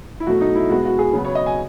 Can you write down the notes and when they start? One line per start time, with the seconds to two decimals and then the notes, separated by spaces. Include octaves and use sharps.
0.20 E4
0.27 B2 F#3 A3 F#4
0.41 D#4
0.55 E4
0.69 B2 G#3 B3 F#4
0.85 F#4
0.99 G#4
1.13 C#3 F#3 B3
1.24 C#5
1.35 D#5
1.46 G#5